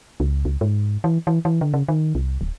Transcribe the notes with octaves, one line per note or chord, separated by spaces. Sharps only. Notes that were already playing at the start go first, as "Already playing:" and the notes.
C#2
C#2
G#2
E3
E3
E3
D3
C#3
D#3
C2
D1